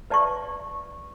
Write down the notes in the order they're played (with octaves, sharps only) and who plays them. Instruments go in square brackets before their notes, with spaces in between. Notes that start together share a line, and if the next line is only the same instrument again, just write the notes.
[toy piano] B4 D5 A5 C#6